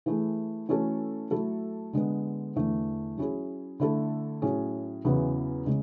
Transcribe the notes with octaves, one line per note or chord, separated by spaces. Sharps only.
E3 A3 E4 G#4
E3 A3 C#4 F#4 A4
F#3 A3 E4 A4
D3 G#3 B3
E2 D3 A3
F#3 C#4 E4 G#4
D3 A3 E4 A4
A2 F#3 C#4 G#4
E2 C#3 F#3 B3 E4
C#3 G#3